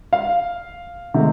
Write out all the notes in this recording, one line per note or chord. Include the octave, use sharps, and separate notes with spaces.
F5
C3 D#3 A3